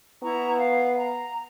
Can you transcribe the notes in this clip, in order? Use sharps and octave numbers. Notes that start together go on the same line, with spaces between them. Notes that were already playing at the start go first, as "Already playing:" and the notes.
B3 E4 A#5 C#6
F5
A#5